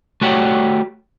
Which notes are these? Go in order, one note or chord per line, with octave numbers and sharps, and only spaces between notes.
A3 F#4 G4 C#5 F#5